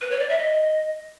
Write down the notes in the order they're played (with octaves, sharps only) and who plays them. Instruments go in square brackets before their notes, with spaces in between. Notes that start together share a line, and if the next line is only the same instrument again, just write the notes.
[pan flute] B4
C#5
D5
E5
D#5